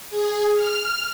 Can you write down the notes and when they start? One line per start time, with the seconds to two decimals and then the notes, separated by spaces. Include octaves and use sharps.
0.10 G#4
0.53 F6